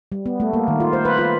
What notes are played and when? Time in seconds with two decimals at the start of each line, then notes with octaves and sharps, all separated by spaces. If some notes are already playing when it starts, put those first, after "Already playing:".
0.12 G3
0.26 B3
0.40 A3
0.53 A#3
0.68 D#3
0.80 F4
0.93 C5
1.05 B4
1.19 F4